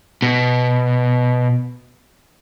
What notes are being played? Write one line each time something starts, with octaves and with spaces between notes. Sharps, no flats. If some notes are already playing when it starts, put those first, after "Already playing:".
B2